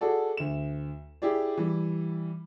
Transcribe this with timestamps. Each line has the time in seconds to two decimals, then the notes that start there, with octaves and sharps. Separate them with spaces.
0.01 F#4 G#4 A4 D5
0.37 D2 E7
1.22 E4 G4 G#4 D5
1.57 E3 G3